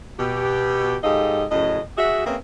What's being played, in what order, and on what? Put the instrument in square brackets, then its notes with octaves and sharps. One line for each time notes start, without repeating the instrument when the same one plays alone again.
[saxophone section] B2 G4
G#2 F4 G4 A4 D#5
F#2 A2 C#3 D#5
F#4 G#4 E5
A#3 C4 C#4 G#4 B4 E5